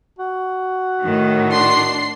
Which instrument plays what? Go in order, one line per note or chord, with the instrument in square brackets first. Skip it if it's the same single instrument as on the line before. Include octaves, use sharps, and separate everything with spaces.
[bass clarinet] F#4
[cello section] A2 D#3
[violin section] D4 C6 C7